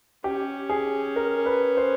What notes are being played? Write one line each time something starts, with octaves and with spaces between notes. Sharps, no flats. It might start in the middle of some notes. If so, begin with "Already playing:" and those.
C#4 G4
G#4
A#4
B4
C5